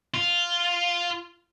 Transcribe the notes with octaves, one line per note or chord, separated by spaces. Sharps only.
F4